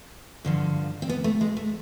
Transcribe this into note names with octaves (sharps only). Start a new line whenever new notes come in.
G2 D3 F3
C4
B3
A3
G#3
A3